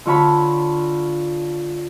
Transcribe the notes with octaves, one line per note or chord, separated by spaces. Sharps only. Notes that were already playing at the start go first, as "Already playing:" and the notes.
D3 F4 C#5 A5 B5